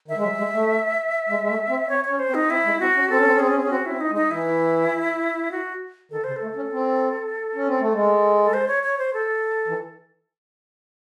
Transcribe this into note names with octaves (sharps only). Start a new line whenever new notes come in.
D#3 E5
G#3
F#3
G#3
A3
G#3
G#3
A3
C4
C4 C#5
C#5
C#4
C5
C4
D#4
C4 E4
G#3
C4 F#4
C#4
C4 A4
C#4
C4
C#4
C4 G#4
C#4
C4
C#4
C4 F#4
C4 C#4 E4
D#4
G#3
D#4
E3 E4
F#4
D#3 A4
C#3 C5
A4
A3
C#4
C4
C#4
C4
A3
G#3
A4
C5
C#5
C#5
C5
A4
E3